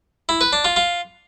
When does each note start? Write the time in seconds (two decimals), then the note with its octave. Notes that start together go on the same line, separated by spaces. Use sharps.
0.29 E4
0.41 B4
0.53 D4
0.65 F4
0.76 F4